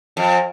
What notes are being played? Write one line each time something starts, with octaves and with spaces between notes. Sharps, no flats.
F2